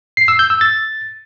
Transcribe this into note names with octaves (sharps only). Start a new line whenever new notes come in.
C7
E6
G6
E6
A6